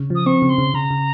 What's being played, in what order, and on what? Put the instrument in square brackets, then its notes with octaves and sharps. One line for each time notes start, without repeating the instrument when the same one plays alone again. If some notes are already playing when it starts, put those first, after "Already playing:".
Already playing: [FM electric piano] C#3
F3
[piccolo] D#6
[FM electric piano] C4 [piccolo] C#6
[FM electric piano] C#3
[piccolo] C6
[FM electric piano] C#3
[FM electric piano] C#3 [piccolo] A#5
[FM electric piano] C#3